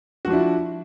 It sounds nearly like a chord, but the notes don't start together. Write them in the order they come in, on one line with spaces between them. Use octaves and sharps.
F#4 F3 D4 E4